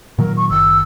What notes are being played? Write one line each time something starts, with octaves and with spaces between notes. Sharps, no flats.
A#2 D#3 F#3 A#4
C#6
F#1 D#3 E6